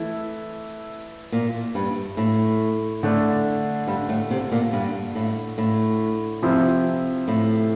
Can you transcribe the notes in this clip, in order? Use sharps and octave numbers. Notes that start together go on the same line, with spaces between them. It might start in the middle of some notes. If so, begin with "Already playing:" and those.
Already playing: E3 A3 E4
A#2
G2
A2
D3 A3 D4
G2
A2
C3
A#2
G2
A2
A2
C3 F3 C4 E4
A2